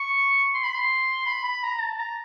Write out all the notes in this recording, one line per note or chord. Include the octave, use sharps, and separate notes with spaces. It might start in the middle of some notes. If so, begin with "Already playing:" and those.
Already playing: C#6
C6
B5
C6
B5
B5
A#5
A5
A#5